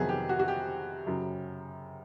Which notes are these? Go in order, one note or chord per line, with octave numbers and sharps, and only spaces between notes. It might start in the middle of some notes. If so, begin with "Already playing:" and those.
Already playing: F2 C3 D#3 F#3 B3 G#4
G4
F#4
F#4
G4
F#2 C#3 F#3